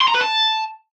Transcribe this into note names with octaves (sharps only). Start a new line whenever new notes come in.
C6
A#5
B4
A5